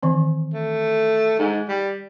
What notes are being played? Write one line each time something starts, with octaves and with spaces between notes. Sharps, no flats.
D#3 E3 C4
A3
G#2
G3